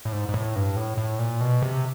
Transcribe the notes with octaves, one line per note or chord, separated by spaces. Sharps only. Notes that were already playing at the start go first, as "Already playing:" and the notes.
A2
G#2
G#2
A2
G2
A2
A2
A#2
B2
C3